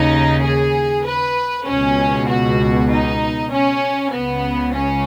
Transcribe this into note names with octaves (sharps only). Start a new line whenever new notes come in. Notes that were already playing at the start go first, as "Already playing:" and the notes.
Already playing: D#2 C#3 D#4
G#4
B4
C#2 B2 C#4
F#4
D#4
C#4
C#2 C#3 B3
C#4